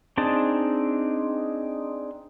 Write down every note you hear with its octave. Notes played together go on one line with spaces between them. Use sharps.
C4 D4 D#4 G#4 A5